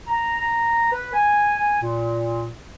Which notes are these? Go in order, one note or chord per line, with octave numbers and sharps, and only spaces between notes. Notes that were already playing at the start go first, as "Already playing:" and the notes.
A#5
B4
G#5
A#2